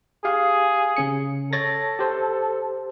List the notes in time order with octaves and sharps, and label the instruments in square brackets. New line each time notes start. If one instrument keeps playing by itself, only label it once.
[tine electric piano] G4 F5 [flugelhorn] G#4
[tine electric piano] C#3 C#4 C#7
[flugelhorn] A4 [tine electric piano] C#5 A6 A#6
[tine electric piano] G4 C5